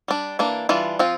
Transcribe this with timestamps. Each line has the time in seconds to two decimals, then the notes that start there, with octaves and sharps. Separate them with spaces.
0.08 G3 D4
0.39 E3 A#3 D4
0.69 E3 G3 D4 F4
0.99 F3 C4 F4